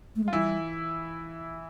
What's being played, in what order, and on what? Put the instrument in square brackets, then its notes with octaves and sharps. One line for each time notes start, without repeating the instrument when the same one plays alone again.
[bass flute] A3
G#3
[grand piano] F4
[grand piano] E3 E4 [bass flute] G3